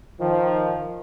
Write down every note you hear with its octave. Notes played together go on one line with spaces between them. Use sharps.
D#3 F3